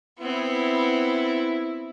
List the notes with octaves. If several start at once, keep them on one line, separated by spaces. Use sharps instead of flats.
B3 C4 E4